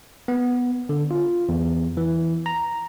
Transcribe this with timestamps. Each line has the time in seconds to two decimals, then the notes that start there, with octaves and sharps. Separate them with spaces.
0.28 B3
0.89 D3
1.11 F4
1.49 E2
1.97 E3
2.46 A#5